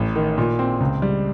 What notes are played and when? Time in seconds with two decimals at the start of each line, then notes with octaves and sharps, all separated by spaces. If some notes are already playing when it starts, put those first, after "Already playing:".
Already playing: A1
0.15 D#3
0.38 A#2
0.59 C4
0.80 C#2
1.02 G3